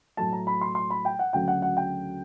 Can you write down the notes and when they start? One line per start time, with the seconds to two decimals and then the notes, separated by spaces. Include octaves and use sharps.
0.17 A2 F#3 A3 A5
0.33 A#5
0.47 B5
0.61 C6
0.75 C6
0.90 B5
1.05 G5
1.19 F#5
1.33 D2 C#3 F#3 A3 G5
1.48 F#5
1.62 F#5
1.77 G5